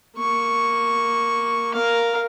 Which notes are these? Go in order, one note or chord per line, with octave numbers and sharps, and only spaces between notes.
A#3 C#6
A#4 F5